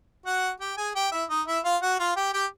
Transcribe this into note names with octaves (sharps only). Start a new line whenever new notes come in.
F#4 F#5
G4 G5
G#4 G#5
G4 G5
E4 E5
D#4 D#5
E4 E5
F4 F5
F#4 F#5
F4 F5
G4 G5
G4 G5